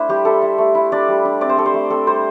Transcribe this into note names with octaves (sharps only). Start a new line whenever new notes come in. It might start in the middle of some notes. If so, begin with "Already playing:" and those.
Already playing: A3 D4 E4 C5
G3 G4
E4 A4
E4
A3
E4
D4 D5
G3
D4
C4 D5
C5
A3 A4
C5
A3
C4 A4
G3 C5